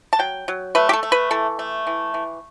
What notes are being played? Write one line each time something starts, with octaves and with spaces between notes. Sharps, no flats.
A5
F#3 G5
F#3
A3 B4
G4
A4
A3
B4
E3 A4
A3
E3
E3